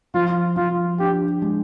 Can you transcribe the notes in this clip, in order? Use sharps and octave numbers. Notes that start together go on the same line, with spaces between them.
F3 F4
F3 F4
D4 G4
G#3